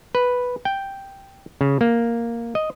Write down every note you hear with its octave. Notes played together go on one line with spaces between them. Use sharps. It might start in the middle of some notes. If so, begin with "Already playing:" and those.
B4
G5
C#3
A#3
D#5